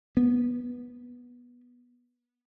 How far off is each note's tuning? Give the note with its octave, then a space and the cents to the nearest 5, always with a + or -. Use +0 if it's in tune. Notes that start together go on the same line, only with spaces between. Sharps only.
B3 -15